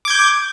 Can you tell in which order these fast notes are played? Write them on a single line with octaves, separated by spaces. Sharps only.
D6 G#6 G6